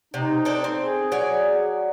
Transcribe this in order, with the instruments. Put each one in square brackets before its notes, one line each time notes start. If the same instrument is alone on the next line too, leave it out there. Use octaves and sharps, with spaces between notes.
[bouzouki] C3 [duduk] D#4
[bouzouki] C4 D4 A4
C4
[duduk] G#4
[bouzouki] F#3 C#5 D5